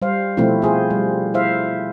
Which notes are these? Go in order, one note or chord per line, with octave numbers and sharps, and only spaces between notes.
G3 C5 F5
B2 F3 A3 C4 E4
F4 G#4 C5
G3
E4 C5 E5 F5